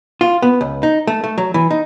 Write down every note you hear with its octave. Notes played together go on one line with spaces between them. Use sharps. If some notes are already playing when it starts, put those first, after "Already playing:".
F4
B3
C#2
D#4
A3
A3
F#3
E3
D#4